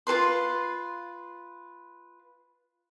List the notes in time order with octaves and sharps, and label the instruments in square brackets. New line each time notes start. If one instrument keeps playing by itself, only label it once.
[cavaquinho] F4 A4 B4 C6